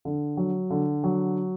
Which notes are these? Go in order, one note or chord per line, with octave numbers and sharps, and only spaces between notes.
D3
F#3
D3
F#3